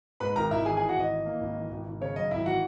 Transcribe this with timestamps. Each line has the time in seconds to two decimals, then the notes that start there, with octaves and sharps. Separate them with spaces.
0.20 G#2 B4 B5
0.35 G#1 A#4 A#5
0.51 G#1 E4 E5
0.65 E3 G#4 G#5
0.77 G#4 G#5
0.81 E3
0.88 F#4 F#5
0.96 G#1 D#5
1.11 E3
1.26 A#3
1.41 G#1
1.56 E3
1.71 G#1
1.86 G#1
2.01 C#3 C#5
2.16 F#2 D#5
2.31 G#1 E4 E5
2.46 E3 F#4 F#5